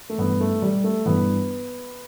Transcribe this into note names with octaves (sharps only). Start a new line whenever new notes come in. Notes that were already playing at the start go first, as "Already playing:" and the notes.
A3
G2 E3 B3
A3
G3
A3
G2 E3 B3